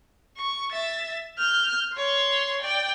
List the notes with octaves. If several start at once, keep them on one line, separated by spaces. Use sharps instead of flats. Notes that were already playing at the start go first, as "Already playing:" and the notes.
C#6
E5 A6
F6 G6
C#5 C6
D5 G5